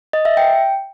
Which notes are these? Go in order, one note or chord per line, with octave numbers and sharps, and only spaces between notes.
D#5
E5
G5